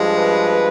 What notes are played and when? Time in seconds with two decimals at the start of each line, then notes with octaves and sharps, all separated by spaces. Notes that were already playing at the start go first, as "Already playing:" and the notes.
Already playing: G2 F3 G#3
0.15 B4